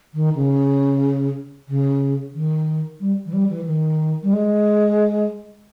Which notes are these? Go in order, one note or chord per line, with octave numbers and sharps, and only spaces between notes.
D#3
C#3
C#3
D#3
G3
E3
G3
E3
D#3
G3
G#3